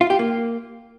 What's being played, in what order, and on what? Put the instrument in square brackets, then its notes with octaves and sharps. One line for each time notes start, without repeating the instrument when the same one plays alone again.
[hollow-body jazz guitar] F4
G4
A#3